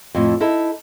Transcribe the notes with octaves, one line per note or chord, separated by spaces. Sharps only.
F2 A2
D#4 E4 A4